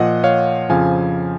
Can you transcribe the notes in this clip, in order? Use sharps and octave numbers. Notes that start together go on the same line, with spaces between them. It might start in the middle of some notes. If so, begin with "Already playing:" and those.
Already playing: A#2 F3 D#5 F#5
C#5 F5
F2 C#3 F3 F5 G#5